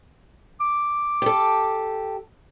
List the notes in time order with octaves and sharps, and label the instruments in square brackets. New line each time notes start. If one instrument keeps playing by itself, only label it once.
[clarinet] D6
[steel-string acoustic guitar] G4 A4